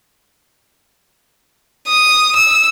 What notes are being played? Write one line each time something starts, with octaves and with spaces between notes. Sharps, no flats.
D#6
E6